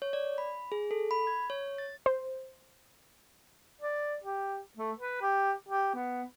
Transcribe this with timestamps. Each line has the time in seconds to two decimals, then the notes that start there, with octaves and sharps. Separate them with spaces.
0.02 C#5
0.13 D5
0.38 B5
0.72 G#4
0.91 A4
1.11 B5
1.27 G#6
1.50 C#5
1.78 A6
2.06 C5
3.81 D5
4.24 G4
4.77 A3
4.98 B4
5.22 G4
5.69 G4
5.95 B3